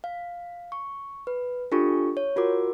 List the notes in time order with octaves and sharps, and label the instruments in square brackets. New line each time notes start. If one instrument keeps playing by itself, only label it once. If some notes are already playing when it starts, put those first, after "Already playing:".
[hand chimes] F5
C#6
B4
D4 F4 G4 A4 C#6
C#5
F4 F#4 A#4 D6